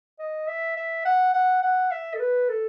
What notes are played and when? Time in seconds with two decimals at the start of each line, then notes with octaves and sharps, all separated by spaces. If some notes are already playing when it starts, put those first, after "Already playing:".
0.19 D#5
0.48 E5
0.77 E5
1.05 F#5
1.34 F#5
1.62 F#5
1.91 E5
2.14 A4
2.20 B4
2.49 A4